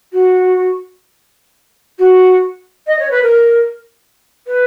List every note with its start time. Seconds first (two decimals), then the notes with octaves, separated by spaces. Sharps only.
0.13 F#4
1.99 F#4
2.87 D#5
2.99 C#5
3.11 B4
3.23 A#4
4.47 B4